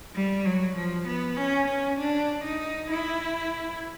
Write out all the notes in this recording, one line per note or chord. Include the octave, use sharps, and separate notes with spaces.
G3
F#3
F3
B3
C#4
C#4
D4
D#4
E4